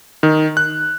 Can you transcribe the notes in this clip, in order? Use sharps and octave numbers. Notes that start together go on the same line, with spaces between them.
D#3
F#6